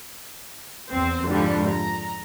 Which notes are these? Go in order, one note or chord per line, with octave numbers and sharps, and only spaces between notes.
E2 C4 C5
F2 G#2 D3 F3 G3
A#5